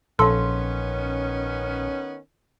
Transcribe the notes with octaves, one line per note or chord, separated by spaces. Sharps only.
A#1 D#3 B3 C#4 A4 F5 C6